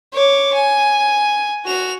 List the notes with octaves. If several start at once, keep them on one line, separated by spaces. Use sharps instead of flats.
C#5 D6
G#5
F#4 F7